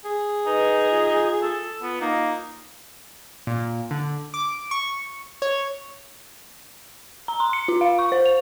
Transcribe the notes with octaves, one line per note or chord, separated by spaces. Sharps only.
G#4
D#4 B4
F4
A4
B3 F4
A#3 D#4
A#2
D3
D6
C#6
C#5
A#5
C6
C#7
F4
F5
C#6
C5
F7